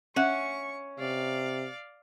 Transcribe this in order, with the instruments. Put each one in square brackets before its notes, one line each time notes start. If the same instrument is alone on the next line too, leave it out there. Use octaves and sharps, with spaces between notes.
[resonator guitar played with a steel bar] C#4 [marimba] E5 F#5 F#6 [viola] C#6
[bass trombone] C3 [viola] D5 F5